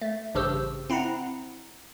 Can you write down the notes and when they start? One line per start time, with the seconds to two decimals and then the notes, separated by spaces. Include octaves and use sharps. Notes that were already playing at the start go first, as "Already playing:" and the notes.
0.01 A3
0.35 A1 G2 C#3 G4 C5 E6
0.90 C4 E4 F#5 A#5